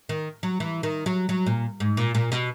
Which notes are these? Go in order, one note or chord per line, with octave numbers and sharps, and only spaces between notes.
D#3
F#3
E3
D#3
F#3
F#3
A#2
G#2
A#2
A#2
B2